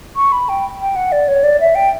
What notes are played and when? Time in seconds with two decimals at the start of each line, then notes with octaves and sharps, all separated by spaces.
0.16 C#6
0.32 B5
0.49 G5
0.81 G5
0.96 F#5
1.12 D5
1.28 C#5
1.44 D5
1.60 E5
1.75 G5